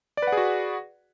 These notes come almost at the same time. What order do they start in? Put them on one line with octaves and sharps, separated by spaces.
D5 B4 F#5 G#4 F#4